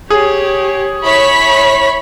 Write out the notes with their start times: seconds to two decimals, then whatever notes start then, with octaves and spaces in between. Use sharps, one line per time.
0.10 G4 G#4 C#5
1.03 E4 C#5 B5 C#6 B6